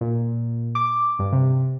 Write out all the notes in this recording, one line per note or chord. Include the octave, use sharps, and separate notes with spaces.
A#2
D6
G2
C3